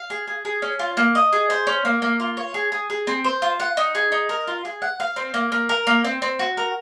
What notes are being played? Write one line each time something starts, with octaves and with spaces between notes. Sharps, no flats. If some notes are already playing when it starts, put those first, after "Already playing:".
Already playing: F5
G#4
G#4
G#4
C#4
F4
A#3
D#5
G#4
C5
C#4
A#3
A#3
F4
C#5
G#4
G#4
G#4
C4
C5
F4
F#5
D#4
G#4
D#4
A#4
F4
G#4
F#5
F5
C4
A#3
A#3
A#4
A#3
C4
C4
F#4
A#4